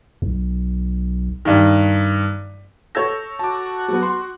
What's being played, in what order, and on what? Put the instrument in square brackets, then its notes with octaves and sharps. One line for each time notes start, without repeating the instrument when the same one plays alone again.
[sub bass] B1
[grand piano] G2 D#3
[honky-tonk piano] A4 C#5 [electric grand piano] E6 G6 A#6
[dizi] F#4 [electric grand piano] A5 D6
[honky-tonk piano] F#3 B3
C6